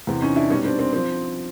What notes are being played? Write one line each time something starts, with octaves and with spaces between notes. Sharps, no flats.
E2 C3 E3
C#4 D#4
D4 E4
B2 G3 C#4 D#4
C4 D4
C4
F3 C4